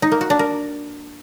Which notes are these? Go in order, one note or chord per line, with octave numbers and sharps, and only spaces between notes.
D#4
A#3
F#4
D4
A#4